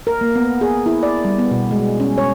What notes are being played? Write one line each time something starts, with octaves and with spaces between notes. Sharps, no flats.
A#4
A#3
B3
G#4
E4
D5
G3
B3
B2
G#3
C#4
C#5